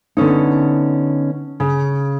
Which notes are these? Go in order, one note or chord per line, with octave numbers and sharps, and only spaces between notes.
D3 B3 C#4 D#4
C#3